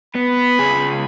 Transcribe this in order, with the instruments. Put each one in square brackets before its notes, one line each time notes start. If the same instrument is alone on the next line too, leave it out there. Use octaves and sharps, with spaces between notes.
[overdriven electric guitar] B3 [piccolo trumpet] B5
[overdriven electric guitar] C#2 G#4